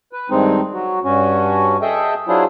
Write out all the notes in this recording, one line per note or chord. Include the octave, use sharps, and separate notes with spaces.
B4
G2 D#3 G#3 C4 D#4
F#3 F#4
G2 C#4 F#4
G#4 A4 D#5 E5 G5
F#3 D4 E4 F4 G#4 C5